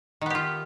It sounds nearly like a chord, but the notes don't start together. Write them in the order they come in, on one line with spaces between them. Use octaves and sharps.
D#3 B3 G4 F4